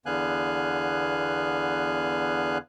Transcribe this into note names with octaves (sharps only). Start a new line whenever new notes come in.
E2 D3 B3 F5 G#5 F#6